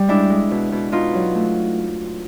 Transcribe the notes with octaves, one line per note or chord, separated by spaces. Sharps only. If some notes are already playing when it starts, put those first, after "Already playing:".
Already playing: G3
G#3 D4 E4
G#3
B2
B2
B2 D#4 F4
F#3
A3